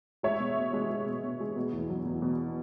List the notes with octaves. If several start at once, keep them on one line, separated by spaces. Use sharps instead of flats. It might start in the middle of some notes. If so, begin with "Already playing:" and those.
G#3 C#5 E5
B2
B2
G#3
G#3
B2
B2
G#3
B2
E2
F#3
E2
B2